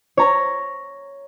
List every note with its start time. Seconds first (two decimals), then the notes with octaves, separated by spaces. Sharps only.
0.17 C#5 A#5